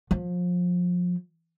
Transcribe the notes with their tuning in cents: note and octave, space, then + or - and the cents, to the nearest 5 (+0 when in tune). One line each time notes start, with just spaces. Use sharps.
F3 +30